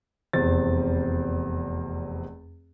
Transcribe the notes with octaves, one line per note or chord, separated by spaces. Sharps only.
F1 E2 C4 A6